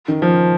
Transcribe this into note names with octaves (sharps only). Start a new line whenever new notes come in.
D#3
F3